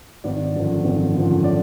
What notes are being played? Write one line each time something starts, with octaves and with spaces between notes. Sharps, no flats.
G#1 D5
F#2 D3 F3
G#1
F#2 D3 F3
D5